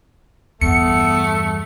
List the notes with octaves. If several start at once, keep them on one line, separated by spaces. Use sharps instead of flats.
E2 G2 A3 B3 C#7